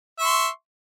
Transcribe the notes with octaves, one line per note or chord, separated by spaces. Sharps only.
E5 C6 C#6